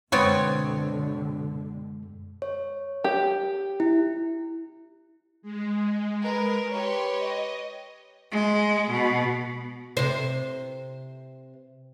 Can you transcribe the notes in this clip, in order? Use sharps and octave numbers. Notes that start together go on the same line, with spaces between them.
F#2 B2 D3 G#3 B3 C4 C#5
C#5
G4
E4
G#3
A#4 B4
G4 B4 C#5 C6
D#5
G#3
B2
C3 C5